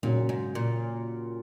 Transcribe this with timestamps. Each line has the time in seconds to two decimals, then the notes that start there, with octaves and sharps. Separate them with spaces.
0.03 A#2 C#3 F#3 C#4
0.29 G#2
0.55 A#2